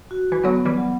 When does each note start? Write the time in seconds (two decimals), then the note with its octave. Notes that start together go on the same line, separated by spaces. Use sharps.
0.11 F#4
0.32 E3
0.43 D3 F#3 B3
0.65 E3 G3
0.77 F#3